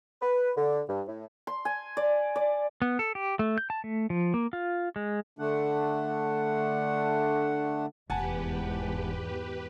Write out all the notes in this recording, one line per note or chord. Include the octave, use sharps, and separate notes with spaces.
B4
D3
G2
A2
C6
G#5
D5
D5
B3
A4
G4
A3
G6
A5
A3
F3
A#3
F4
G#3
D3 A3 D4 F#5
F1 E2 G#2 G4 B4 F#5 G#5 A5